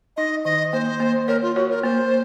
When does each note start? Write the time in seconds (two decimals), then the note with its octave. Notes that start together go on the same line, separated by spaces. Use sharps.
0.17 D#4 D#5
0.45 D#3 D#5
0.73 A#3 C5
1.00 A#3
1.28 A#4 C#5
1.42 F4
1.55 F#4 C#5
1.70 A#4
1.83 A#3 C5